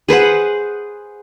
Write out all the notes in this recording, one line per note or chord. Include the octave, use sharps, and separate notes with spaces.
G#4 B4 C5 F#5